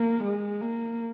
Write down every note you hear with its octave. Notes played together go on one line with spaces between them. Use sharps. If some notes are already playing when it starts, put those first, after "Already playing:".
Already playing: A#3
G#3
A#3